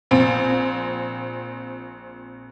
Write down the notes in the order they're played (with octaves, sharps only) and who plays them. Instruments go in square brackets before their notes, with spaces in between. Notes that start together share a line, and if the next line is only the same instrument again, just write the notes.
[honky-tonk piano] A#1 C4